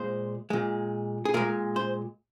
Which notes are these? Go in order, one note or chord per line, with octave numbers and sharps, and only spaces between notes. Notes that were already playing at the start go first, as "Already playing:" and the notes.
Already playing: A#2 G#3 C5
A#2 G#3
G#4
A#2 G#3 A#4
C5